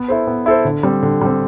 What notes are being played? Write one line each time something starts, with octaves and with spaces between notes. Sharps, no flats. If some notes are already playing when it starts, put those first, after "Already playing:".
Already playing: B3
E4 A4 C5
B3
E4 A4 C5
D3
G3 C4
D3
G3 C4